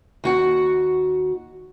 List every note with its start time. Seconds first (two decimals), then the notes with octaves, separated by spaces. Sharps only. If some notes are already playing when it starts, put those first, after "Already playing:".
0.24 D#2 F#4 F#5